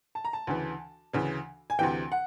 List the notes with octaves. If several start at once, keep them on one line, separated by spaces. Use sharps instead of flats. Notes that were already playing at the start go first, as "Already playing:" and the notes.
A5
A#5
A5
D2 C#3 E3
D2 C#3 E3
G#5
D2 C3 E3 G5
F#5